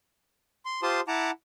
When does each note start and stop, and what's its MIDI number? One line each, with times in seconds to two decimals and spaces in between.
0.65 0.81 84
0.83 1.01 65
0.83 1.01 67
0.83 1.01 72
0.83 1.01 81
0.83 1.01 84
0.83 1.01 87
1.08 1.31 64
1.08 1.31 78
1.08 1.31 81
1.08 1.31 82
1.08 1.31 86